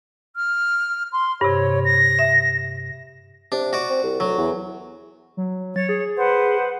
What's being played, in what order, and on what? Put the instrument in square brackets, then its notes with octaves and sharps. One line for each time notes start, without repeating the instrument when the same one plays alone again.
[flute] F6
C6
[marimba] G2 C3 [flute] C#5
[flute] A#6
[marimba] E5
[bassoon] C3 [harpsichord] D4
[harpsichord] F#4 D5
[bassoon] C4
C2
[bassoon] D2 [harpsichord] F#3
[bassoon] E2
[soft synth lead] F#3
[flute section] C#5 [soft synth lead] A6
[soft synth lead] G#4
[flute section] B4 C5 F#5